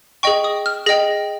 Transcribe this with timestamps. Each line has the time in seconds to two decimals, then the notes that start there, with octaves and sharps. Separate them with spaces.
0.23 G#4 D#5 G5 C#6
0.44 D#6
0.66 F6
0.86 G#4 D#5 G5 A#6